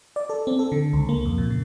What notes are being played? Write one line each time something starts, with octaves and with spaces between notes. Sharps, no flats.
D5
A4
C4
A4
D3
C#2
A#3
F2
A#2
C#3